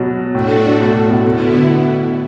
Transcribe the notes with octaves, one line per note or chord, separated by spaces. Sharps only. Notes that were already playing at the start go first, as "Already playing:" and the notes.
Already playing: B2 F#3
A2 A3 D4 F#4 A4
B2
A2
B2
B2 D3 B3 E4